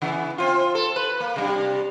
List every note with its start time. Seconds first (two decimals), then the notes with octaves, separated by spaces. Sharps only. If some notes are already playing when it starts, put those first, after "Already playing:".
0.02 C#3 E3 B3
0.38 C4 F4
0.75 A4
0.96 B4
1.20 A#3
1.36 C3 G3 D4